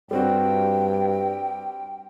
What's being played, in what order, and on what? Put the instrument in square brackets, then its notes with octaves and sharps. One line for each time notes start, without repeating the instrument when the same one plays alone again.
[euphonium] G2 [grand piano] G3 C4 F#4 [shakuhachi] G5